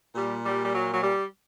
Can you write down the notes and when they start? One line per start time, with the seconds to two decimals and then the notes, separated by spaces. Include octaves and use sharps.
0.15 A#2 G3
0.45 G3
0.64 G3
0.74 F#3
0.93 F#3
1.03 G3